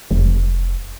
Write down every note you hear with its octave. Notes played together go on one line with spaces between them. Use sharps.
F1